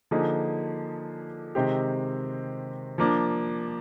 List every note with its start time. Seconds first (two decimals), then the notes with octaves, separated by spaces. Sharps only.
0.11 D3 F3 A#3 D#4 G#4
1.55 C3 D#3 G#3 C4 G4
2.98 F3 A#3 D4